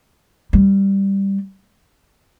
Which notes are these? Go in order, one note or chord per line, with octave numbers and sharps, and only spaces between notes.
G3